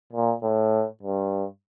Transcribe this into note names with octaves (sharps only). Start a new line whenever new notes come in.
A#2
A2
G2